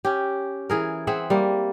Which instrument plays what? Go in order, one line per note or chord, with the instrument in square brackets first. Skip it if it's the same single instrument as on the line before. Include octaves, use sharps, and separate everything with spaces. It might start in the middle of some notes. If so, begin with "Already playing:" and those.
[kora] C#4 G4
E3 G#4 A#4
C4 G#4 E5 F#5
G3 A#3